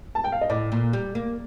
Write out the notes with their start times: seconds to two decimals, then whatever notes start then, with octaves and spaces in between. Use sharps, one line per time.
0.15 A5
0.24 G5
0.32 F5
0.41 D#5
0.50 A2 D5
0.72 A#2
0.93 G3
1.15 A#3